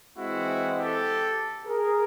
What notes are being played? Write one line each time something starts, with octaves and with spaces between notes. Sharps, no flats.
E3 G#3 C4 E4 F#4
G4 A4
G#4 A#4